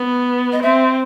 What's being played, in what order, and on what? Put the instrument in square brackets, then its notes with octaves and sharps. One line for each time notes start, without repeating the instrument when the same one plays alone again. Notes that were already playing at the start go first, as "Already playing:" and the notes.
Already playing: [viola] B3
[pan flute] D#5
[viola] C4 [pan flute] E5